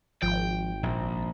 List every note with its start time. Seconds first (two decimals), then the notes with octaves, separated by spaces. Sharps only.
0.22 G#1 F3 G5
0.83 A#1 A#2